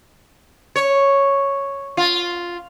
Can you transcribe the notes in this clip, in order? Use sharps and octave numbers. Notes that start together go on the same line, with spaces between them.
C#5
F4